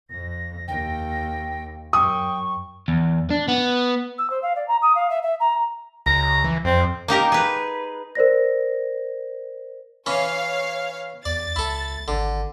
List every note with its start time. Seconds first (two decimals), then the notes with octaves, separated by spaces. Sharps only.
0.10 F2 A#6
0.68 D#2 G5
1.93 F#2 G5 C#6 D#6
2.88 E2
3.30 D4
3.48 B3
4.18 E6
4.30 C5
4.42 F5
4.55 D5
4.68 A#5
4.82 D#6
4.95 F5
5.10 E5
5.22 E5
5.40 A#5
6.06 C#2 A#5
6.44 E3
6.65 F2 C4
7.08 A#3 D#4 G4 A#4
7.32 G#4 B4
8.15 A#4 C5 D5 A#6
10.06 E3 C#4 C#5 F5
11.25 E2 D5 A6
11.56 C#2 E4 A4
12.08 G#1 D3